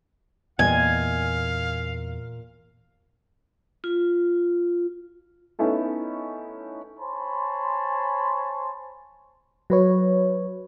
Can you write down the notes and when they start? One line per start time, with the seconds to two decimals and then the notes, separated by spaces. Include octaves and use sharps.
0.59 E2 A#2 A#4 D#5 F5 G#5
3.84 F4
5.59 A3 B3 C#4 D#4 E4 A4
6.99 C5 C#5 G#5 A5 B5 C6
9.70 F#3 B4 C#5